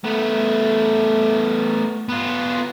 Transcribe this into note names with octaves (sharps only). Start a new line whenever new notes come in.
A3 B3
B3 F4